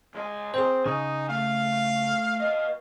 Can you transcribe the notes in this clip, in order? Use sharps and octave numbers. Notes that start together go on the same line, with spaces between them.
C#2 G#3 G#5
C4 G#4 C5
C#3 D#4 G#5
A3 F5
B4 D#5